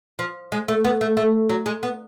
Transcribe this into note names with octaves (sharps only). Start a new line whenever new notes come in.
F3
G#3
A3
B3
A3
A3
F#3
G#3
B3